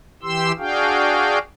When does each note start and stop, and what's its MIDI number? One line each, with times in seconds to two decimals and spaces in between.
0.23 0.52 52
0.23 0.52 67
0.23 0.52 84
0.23 0.52 88
0.58 1.39 62
0.58 1.39 66
0.58 1.39 68
0.58 1.39 77
0.58 1.39 79